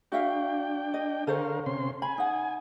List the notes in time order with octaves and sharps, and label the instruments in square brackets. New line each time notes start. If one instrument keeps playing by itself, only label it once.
[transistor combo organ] D4 G5 [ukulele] F#4 E5 F5
[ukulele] D#5
[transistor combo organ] D3 A#4 F5 [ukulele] A4 C5 C#5
[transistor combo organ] C3 C#4 C6
[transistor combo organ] G#5 [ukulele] B5
[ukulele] D#4 F#5